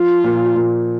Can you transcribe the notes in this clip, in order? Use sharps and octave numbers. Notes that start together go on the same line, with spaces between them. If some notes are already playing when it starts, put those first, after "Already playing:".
Already playing: F3 F4
A#2
A#2